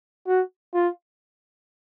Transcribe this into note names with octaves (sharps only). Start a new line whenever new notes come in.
F#4
F4